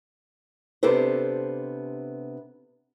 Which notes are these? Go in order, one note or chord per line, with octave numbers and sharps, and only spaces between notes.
C3 B3 D4 G4 A4 C5